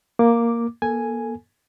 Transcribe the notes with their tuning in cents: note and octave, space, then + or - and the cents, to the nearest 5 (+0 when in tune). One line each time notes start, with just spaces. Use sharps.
A#3 +0 D6 +0
A#3 +40 A4 +10 G#5 +0